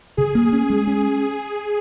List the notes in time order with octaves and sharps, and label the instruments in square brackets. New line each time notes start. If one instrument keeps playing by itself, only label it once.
[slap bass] C#3 [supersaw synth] G#4
[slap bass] A#3
C#4
G#3
C#4